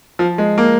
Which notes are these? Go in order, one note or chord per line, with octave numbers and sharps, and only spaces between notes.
F3
G#3
A#3